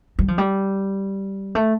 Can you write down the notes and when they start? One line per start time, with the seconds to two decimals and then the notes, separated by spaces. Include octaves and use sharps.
0.19 G3
0.28 F3
0.38 G3
1.55 A3